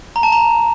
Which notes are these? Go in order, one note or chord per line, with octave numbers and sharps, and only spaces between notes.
A#5
A5
A#5